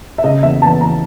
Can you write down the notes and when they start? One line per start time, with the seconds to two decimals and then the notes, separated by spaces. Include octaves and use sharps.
0.18 E5
0.24 C#3 D#5
0.43 E2 E5
0.62 E2 A5
0.81 E2 A#5